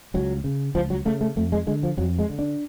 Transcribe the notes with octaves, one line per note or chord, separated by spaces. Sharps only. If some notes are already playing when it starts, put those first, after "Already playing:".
C#2 F#3
C#3
C#2 F3
F#3
C#3 A3
A3
F2 A3
G#3
D3 G#3
F3
F2 F#3
G#3
D3
D4